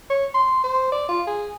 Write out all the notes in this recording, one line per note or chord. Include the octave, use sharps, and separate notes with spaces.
C#5
C6
C5
D5
F4
G#4